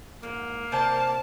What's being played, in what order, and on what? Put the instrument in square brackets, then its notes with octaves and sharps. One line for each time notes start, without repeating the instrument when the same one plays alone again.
[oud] G#2 [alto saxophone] A#3
[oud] C3 C5 D5 [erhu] A5